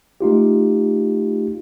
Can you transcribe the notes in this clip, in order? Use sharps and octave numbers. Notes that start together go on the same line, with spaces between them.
A3 D#4 F4 G4